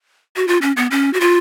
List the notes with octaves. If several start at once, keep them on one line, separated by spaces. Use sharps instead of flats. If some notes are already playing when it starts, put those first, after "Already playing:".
F#4
F4
C#4
B3
C#4
F#4
F4